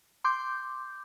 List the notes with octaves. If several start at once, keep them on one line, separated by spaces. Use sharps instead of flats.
C6 D6 G6